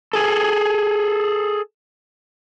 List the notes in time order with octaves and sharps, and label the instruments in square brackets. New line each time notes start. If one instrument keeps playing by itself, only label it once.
[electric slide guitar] G#4 A4